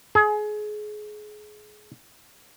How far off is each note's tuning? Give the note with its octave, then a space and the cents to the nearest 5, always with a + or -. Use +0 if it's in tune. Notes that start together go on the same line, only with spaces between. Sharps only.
G#4 +25